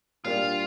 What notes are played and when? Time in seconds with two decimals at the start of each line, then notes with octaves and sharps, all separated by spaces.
0.24 A#2 G3 A#3 D4 F4 G4